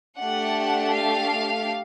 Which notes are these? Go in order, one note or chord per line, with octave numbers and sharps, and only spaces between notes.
A3 D4 G4 F#5
F5